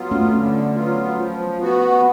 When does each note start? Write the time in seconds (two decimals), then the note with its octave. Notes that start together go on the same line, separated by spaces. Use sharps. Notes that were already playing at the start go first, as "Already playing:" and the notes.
Already playing: F#3 B3 F4
0.11 A3 C#4
0.34 D3
0.75 F#3 B3 F4
1.16 F3
1.60 B3 F#4